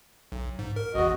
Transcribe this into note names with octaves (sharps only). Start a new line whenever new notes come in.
B1
G#2
A#4
A1 E2 F#4 D#5